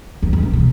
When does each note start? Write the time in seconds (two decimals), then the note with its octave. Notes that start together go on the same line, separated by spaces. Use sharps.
0.22 E2
0.33 E2
0.43 A#2
0.53 B2